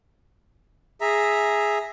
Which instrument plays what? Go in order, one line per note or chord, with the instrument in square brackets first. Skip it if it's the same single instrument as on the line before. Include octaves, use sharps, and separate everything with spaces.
[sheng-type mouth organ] G#4 E5 A#5